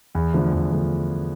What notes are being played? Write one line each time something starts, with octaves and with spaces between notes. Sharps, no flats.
E2
D3 F3 A3
E2
D3 F3 A3